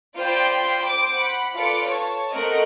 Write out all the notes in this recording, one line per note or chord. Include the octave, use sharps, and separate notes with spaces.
F4 C5 D5 G5 B5 C6
C5 D6
F#5 B5
F4 A4 B4 D5 D6 C#7
C#5 A5 C#6
A3 C4 A#4 D#5 F#5 D7